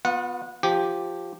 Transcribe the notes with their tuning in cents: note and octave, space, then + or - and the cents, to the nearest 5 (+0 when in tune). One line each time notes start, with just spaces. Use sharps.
B3 +0 F4 +30 F#5 -20
F3 +0 G4 +0